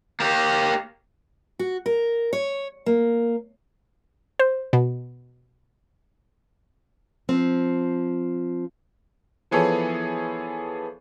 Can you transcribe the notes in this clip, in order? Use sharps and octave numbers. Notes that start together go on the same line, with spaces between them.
A#3 G4
F#4
A#4
C#5
A#3
C5
B2
F3 C4
E3 F3 B3 G#4 A4 C#5